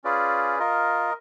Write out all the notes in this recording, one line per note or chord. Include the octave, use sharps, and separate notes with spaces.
C#4 F4 G#4 B4 D5
F4 A#4 D#5